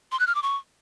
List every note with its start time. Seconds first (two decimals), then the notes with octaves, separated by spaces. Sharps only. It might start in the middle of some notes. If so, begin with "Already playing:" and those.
0.12 C6
0.20 F#6
0.27 F6
0.35 D6
0.43 C#6